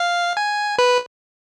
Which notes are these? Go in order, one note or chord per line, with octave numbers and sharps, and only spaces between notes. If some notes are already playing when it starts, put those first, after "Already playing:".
Already playing: F5
G#5
B4